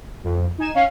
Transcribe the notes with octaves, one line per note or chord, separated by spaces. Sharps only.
F2
D#4 G#5 E7
C#4 F5